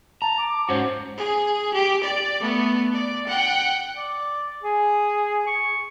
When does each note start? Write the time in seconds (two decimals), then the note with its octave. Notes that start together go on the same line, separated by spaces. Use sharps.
0.22 A5 A#5
0.38 D6
0.69 G#2 C#4 F#4 C5
1.17 G#4
1.74 G4
2.04 D5
2.41 A3 B3
2.93 D5
3.27 F#5 G5
3.97 D5
4.62 G#4
5.47 C#6